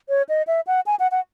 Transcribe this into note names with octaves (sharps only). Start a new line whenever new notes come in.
C#5
D#5
E5
F#5
G#5
F#5
F#5